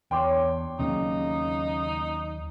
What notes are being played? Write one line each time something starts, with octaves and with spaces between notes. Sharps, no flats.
E2 D4 C#5 G5 C6 D6
D#2 C#3 F#3 A#3 D#4